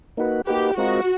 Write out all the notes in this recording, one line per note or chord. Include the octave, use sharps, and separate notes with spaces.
A#3 D#4 F#4 B4
A#3 D#4 F#4 G4 B4
G#3 C4 F4 F#4 A#4 D#5